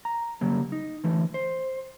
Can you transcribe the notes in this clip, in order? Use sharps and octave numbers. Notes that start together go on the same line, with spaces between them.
A#5
C#3 F#3 G3 A#3
D#4
D3 E3 A3
C5